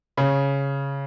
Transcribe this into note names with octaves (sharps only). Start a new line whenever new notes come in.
C#3